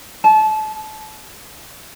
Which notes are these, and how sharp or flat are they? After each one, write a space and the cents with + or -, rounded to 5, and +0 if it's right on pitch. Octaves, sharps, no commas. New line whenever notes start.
A5 -30